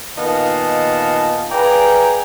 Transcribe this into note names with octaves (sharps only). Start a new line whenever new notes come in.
A#2 D#3 B3 D#5 F5 A5
G#4 B4 D5 F5 G5 A#5